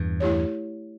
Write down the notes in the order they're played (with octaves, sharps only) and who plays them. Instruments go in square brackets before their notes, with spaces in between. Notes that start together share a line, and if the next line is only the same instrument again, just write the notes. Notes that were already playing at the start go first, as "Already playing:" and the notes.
Already playing: [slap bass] E2 G2
[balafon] A3 E4 G4 C#5